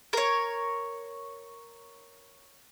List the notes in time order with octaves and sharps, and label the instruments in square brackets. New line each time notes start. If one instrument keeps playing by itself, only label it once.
[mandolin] A#4 C#5